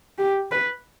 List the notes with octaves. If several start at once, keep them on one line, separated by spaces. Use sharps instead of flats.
G4
B4